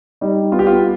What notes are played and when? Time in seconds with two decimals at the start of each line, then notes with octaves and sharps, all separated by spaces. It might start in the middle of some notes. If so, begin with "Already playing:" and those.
0.21 G3 D#4
0.52 B3 F4
0.59 G4
0.67 F4